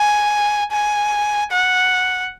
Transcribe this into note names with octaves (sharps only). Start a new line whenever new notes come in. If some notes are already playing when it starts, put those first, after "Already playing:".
Already playing: G#5
G#5
F#5